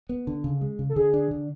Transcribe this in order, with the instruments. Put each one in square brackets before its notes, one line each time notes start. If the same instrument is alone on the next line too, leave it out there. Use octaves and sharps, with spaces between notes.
[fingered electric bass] B3
D3
C#3
G#3
C#3
[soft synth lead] A4
[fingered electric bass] D3 [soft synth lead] G#4
[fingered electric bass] D4
D3